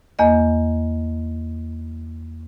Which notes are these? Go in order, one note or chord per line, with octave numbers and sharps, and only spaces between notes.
E2 A#3 D#5